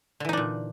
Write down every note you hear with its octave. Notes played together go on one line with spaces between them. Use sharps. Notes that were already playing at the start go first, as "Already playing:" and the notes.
A#2 D3 E3 D4 D#4